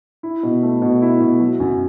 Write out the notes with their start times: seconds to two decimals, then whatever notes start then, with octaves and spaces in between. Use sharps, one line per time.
0.23 E4
0.43 B2
0.63 A3
0.82 B2
1.02 E4
1.20 B2
1.40 F#3
1.60 F#2